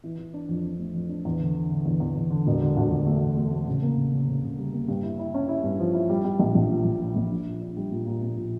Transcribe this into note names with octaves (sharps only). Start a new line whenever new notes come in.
E3
E3
D4
F2
D4
A3
F2
D4
E2
D3
D3
D3
E2
E2
E2
D3
E1
D3
D2
D2
A3
E1
A3
A3
C#3
A#3
C#3
C#3
C#3
C#3
G3
A#3
G2
E4
E4
C#4
E4
G2
F3
E4
G3
G3
A#1
A#1
A#2
A#1
A#2
A#1
D4
A#2
D4
G3
A#2
A#2
A#2
A#2